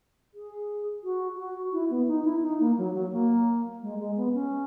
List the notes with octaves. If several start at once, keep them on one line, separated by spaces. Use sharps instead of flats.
G#4
F#4
F#4
E4
B3
D#4
E4
D#4
A#3
F#3
F#3
A#3
G#3
G#3
B3
C#4